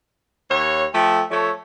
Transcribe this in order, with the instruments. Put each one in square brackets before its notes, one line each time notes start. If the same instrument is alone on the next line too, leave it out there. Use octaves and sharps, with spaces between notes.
[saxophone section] D#2 C#5
[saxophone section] F3 A3 [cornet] G5
[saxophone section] F3 A3 [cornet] C#5